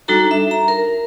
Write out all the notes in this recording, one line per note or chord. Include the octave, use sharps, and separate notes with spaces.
G3 D4 D#4 F#4 A4 A#5
E5
A#5
A#4